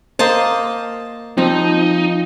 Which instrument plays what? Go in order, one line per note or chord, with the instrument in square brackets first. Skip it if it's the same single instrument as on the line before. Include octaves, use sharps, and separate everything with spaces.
[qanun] A#3 D#5 A5 [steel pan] C5
[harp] F3 [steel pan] C4 [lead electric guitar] D#4